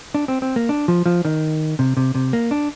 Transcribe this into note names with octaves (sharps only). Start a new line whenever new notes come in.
D4
C4
C4
A#3
D4
F3
F3
D#3
C3
C3
C3
A#3
D4